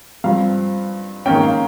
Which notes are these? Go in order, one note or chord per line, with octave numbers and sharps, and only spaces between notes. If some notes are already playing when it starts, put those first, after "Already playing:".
G2 F3 C4 F5
G#2 D#3 A#3 C#4 G5
F5